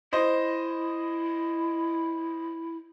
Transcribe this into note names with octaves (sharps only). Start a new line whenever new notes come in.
E4 C5 D#5